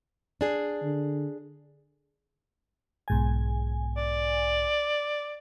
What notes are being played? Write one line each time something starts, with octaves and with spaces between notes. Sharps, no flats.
D4 G#4
D3
B1 G#2 G#5
D5